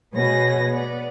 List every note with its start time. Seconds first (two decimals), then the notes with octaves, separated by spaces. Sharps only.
0.14 B2 B3 G#4 B4 C#5 A#6
0.69 B3 D5